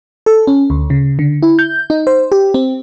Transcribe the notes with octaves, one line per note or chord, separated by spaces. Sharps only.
A4
C#4
D2
C#3
D3
E4
G6
D#4
C5
G4
C4